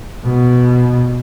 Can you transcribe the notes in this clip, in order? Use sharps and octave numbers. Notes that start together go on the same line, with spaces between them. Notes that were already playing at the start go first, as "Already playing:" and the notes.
B2